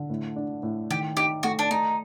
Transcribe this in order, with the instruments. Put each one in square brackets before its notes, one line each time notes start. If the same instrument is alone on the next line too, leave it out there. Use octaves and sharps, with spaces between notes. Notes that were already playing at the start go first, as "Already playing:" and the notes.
Already playing: [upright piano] D3
A2
D4
A2
[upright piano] D#3 [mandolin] G4
[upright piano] D#4 [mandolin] G4
[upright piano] A3 [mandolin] F#4
[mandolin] D4
[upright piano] A3 [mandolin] D#4